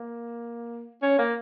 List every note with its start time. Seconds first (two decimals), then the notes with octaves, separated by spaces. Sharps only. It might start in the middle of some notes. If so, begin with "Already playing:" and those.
Already playing: A#3
1.02 C#4
1.19 A#3